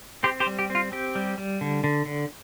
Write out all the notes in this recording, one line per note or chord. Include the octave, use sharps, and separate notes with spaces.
C4 G4 C5
G4 C5
G3
G4
C4
F4
C4 G4
G3
G3
D3
D3
D3